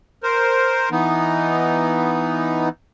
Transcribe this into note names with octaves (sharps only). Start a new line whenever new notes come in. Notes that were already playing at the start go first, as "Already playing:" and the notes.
A#4 C5
E3 B3 D#4